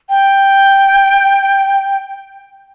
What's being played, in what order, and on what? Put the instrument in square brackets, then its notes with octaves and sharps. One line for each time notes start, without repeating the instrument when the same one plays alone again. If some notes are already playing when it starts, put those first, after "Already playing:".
[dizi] G5